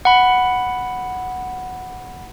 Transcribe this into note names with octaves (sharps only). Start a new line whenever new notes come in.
F#5 B5